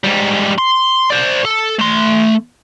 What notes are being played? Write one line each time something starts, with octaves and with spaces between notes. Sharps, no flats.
G#2 G3
C6
C5 D5
A4
A3 C6